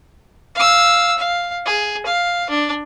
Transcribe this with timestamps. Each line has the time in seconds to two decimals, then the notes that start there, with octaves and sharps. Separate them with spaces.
0.55 F5 E6
1.18 F5
1.66 G#4
2.06 F5
2.50 D4